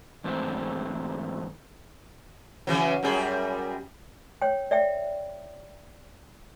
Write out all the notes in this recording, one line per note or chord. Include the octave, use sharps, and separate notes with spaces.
E2 G#2 D3 A3 C4
C#3 E3 F#3
F#2 G3 G#4
C#5 G5
D5 E5 G5